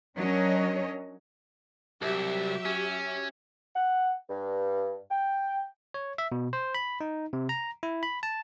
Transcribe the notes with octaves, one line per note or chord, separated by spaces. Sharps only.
F#3 C#4 D4 A#4 C#5 D#5
C2 F#3 G4 E5
C#4
F#5
G2
G5
C#5
E5
B2
C5
B5
D#4
C3
A#5
E4
B5
A5